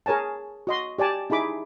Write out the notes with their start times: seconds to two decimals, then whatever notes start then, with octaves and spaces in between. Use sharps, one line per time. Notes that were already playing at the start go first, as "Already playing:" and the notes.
0.06 G#4 A#4 C#5 G#5 A5
0.67 F#4 D#5 C6
0.99 G4 D5 G#5 A5
1.30 D#4 E4 G#4 B5 D6